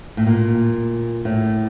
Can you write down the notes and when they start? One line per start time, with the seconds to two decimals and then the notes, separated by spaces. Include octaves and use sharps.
0.17 A2
0.27 A#2
1.25 A2